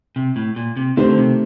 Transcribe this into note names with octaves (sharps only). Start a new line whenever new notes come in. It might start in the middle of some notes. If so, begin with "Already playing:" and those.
C3
A2
A#2
C3
D3 D#3 A3 C4 G4 C5
D3
C3